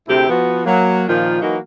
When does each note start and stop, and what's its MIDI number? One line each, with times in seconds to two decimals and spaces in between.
0.08 0.28 38
0.08 0.28 48
0.08 0.28 60
0.08 0.28 64
0.08 0.28 67
0.08 0.28 68
0.28 0.63 53
0.28 0.63 59
0.28 0.63 66
0.65 1.04 54
0.65 1.04 58
1.08 1.40 46
1.08 1.40 51
1.08 1.40 53
1.08 1.40 65
1.41 1.58 52
1.41 1.58 54
1.41 1.58 58
1.41 1.58 63
1.41 1.58 66